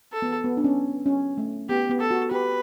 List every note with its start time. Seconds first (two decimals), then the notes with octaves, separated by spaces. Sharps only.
0.12 A4
0.22 B3
0.44 B3
0.57 D4
0.64 C#4
1.06 C#4
1.38 A3
1.69 B3 G4
1.89 B3
2.00 A4
2.11 F#4
2.31 G4 B4